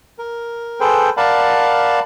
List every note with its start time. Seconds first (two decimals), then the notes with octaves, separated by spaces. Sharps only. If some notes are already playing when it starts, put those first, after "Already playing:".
0.19 A#4
0.80 G#4 A4 B4 C5 G5
1.17 A#4 D5 F5 F#5 A5 B5